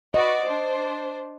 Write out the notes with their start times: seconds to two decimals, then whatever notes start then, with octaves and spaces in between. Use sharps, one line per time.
0.14 F#4 B4 D5 D#5
0.46 D4 C5